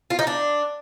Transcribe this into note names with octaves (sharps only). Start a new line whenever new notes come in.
F4
D#4
D4